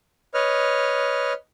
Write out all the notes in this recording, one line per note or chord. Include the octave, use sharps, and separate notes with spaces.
B4 C#5 D#5 F6